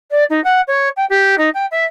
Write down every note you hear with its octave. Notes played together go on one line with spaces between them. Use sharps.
D5
D#4
F#5
C#5
G5
G4
D#4
G5
E5